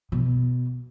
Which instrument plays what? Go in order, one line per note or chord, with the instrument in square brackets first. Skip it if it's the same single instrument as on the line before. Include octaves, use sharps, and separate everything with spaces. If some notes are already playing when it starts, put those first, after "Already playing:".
[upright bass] B2